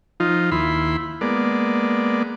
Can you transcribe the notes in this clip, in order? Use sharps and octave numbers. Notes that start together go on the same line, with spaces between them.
F3 D#4 F4
D#2 E4 B5 C6
G#3 A#3 B3 D5